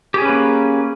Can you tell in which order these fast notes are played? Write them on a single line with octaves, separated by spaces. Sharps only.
G4 G#4 C#4 B4 A#3